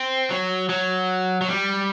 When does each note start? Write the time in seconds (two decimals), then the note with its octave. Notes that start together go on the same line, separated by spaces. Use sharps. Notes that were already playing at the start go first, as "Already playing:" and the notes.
Already playing: C4
0.31 F#3
0.69 F#3
1.42 F#3
1.49 G3